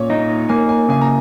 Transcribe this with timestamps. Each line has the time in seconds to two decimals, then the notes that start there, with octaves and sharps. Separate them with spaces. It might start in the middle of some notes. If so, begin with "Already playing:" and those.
Already playing: A#2 C#4 C#5
0.10 D#4 D#5
0.49 A#3 G#5
0.69 G#5
0.89 C#3 G#5
1.02 A#5